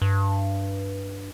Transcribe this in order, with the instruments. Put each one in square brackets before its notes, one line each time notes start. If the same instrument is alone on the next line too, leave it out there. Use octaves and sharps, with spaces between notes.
[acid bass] G2